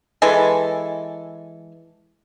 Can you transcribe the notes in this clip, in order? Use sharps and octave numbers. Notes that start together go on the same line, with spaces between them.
E3 G#3 A4 G#5